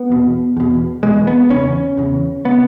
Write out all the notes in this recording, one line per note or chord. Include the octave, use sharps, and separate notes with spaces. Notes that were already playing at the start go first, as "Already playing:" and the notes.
Already playing: B3
E2 B2
E2 B2
E2 B2 G#3
B3
E2 C#3 C#4
E2 C#3
C#3 B3